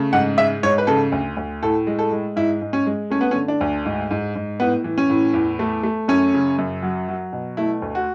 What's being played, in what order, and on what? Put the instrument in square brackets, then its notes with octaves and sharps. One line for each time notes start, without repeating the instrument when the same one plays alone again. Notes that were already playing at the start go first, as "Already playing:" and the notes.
Already playing: [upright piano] C#3 A3
G#2 F#5
G#3 E5
G#2 C#5
B4
C#3 A4
D2
D2
A2 A4
G#3
A4
G#3
G#2 E4
G#2
C#4
G#3
A3 C#4
B3
C#4
D3
D4
D2
G#2
G#2
G#2
A2 B3
E3
C#4
A2
E2
A3
A3
F#2 C#4
C#3
F#2
F#3
F#3
B2
A3 E4
D2
F#4